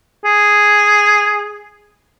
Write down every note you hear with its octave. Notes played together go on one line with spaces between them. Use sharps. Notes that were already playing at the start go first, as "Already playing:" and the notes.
G#4